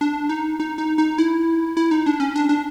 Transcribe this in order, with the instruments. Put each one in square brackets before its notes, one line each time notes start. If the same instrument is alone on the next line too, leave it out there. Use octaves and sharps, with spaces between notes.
[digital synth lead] D4
D#4
D#4
D#4
D#4
E4
E4
D#4
D4
C#4
D4
D4